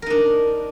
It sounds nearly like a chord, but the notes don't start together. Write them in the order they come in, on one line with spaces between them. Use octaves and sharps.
A#4 D#4 D4